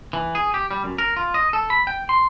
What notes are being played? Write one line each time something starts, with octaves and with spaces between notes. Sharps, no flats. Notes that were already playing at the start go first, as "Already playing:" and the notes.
E3
G#4
G4
G3
F#2
A#4
F4
D#5
A4
B5
G5
C6